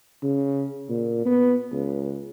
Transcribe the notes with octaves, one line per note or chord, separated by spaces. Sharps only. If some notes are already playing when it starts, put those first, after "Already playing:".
C#3
A#2
B3
C#2